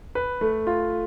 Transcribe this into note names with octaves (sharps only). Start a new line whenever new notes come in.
B4
A3
F4